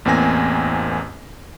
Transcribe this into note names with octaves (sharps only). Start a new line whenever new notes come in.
A1 E2 A#3 C4 G#5 A#6